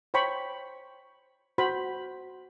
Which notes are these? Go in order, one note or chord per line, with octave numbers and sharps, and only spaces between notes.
C5 C#5 G5 B5 C#6
F#4 C5 B5